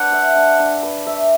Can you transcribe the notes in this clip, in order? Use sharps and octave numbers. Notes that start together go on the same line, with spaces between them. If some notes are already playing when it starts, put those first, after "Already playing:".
Already playing: D4 B4 F#5
E5
D4
D4
B4
E5